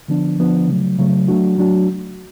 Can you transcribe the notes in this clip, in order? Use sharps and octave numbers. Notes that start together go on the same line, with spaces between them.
D3 F3 B3 D4
D3 F3 B3 D4
C#3 F#3 A3
C#3 F#3 A3
F#3 A3 D4 F#4
F#3 A3 D4 F#4